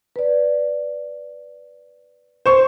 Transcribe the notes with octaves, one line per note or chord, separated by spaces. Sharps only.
B4 D5
C5 C#6